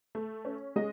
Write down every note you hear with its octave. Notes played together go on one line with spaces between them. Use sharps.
A3
C#4
G#3 D#5